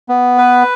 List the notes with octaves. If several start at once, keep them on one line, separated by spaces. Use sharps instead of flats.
B3
B4